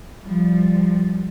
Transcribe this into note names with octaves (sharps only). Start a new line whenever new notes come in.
F3 G3